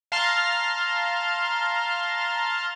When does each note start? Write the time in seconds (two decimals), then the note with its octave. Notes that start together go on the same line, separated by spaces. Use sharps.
0.12 F5 A5 A#5 C6 F6